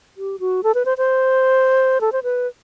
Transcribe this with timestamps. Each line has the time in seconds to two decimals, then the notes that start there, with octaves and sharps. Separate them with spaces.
0.17 G4
0.40 F#4
0.63 A4
0.75 B4
0.85 C5
0.98 C5
2.01 A4
2.12 C5
2.23 B4